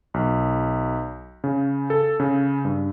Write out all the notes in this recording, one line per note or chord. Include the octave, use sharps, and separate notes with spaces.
B1
C#3
A4
C#3
G2